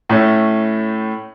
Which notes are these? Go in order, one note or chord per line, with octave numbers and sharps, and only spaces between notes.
A2 A3 C#4